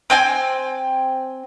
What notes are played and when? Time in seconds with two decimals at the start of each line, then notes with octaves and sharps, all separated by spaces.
0.10 C4 G5 G#5